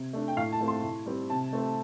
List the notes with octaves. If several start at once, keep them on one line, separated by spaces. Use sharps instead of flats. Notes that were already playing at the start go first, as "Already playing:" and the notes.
Already playing: C3
A3 D4
G5
A2 F5
A5
A3 C4
C6
A2
G3 C4
C3 A5
A3 C4